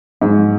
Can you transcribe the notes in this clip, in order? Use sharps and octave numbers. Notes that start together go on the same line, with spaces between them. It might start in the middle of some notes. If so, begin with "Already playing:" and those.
G#2 F#3